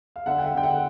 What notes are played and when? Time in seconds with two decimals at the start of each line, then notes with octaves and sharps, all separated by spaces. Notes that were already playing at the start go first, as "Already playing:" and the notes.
0.16 F5
0.26 D3 E5 F#5
0.38 G5
0.45 E5 F#5
0.54 D3 G5
0.63 E5 F#5